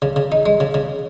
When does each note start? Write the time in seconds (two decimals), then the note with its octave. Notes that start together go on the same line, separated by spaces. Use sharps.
0.02 C#3
0.16 C#3
0.32 D#4
0.46 G#3
0.60 C#3
0.74 C#3